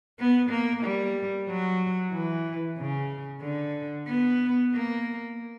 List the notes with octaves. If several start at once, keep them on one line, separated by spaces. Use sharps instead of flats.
B3
A#3
G3
F#3
E3
C#3
D3
B3
A#3